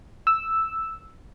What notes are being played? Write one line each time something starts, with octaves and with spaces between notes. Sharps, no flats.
E6